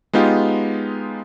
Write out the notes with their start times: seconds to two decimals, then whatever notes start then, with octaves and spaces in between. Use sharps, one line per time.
0.13 G#3 B3 D#4 F4 G4